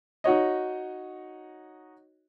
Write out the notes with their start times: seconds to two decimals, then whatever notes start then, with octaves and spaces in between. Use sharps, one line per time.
0.24 D#4 F#4 C#5 D#5